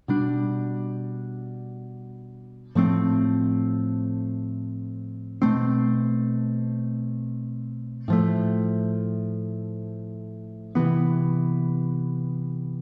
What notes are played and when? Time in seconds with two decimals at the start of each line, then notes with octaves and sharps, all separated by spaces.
0.08 B2 G3 D4
2.75 A2 F3 A3 C4
5.42 B2 A3 C4
8.08 A2 F3 A3
10.75 C3 E3 B3